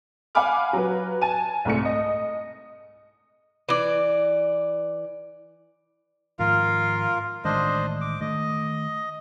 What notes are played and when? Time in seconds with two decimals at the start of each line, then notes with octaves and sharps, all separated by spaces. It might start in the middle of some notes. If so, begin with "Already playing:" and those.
0.35 F5 F#5 G#5 B5 D6 F6
0.73 F#3 B4
1.21 G#5 A5 D#7
1.65 C2 G#2 A3 C#7
1.85 D#5
3.69 E3 D5
6.39 G#2 D#3 F3 F4 A#4 F5
7.45 A1 D#3 G#3 D4 C5 D#5
8.01 D6
8.21 D#3 A3 D#5